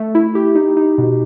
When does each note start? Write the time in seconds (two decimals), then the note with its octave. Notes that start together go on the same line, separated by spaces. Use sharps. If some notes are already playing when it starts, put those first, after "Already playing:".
Already playing: A3
0.15 E4
0.35 G4
0.55 D#4
0.77 D#4
0.98 B2